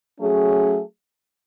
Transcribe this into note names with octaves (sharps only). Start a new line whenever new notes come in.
F#3 A3 C#4 G#4